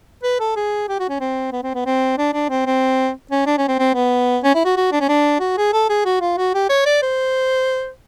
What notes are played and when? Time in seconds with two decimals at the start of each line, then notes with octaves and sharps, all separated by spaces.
0.23 B4
0.40 A4
0.56 G#4
0.88 G4
0.99 F#4
1.09 C#4
1.20 C4
1.52 B3
1.63 C4
1.74 B3
1.86 C4
2.18 D4
2.33 D4
2.49 C4
2.66 C4
3.31 C#4
3.46 D4
3.58 C#4
3.68 C4
3.79 C4
3.95 B3
4.44 C#4
4.55 E4
4.65 F#4
4.77 F#4
4.92 D4
5.01 C#4
5.08 D4
5.40 F#4
5.57 G#4
5.73 A4
5.89 G#4
6.05 F#4
6.21 F4
6.37 F#4
6.54 G4
6.69 C#5
6.86 D5
7.02 C5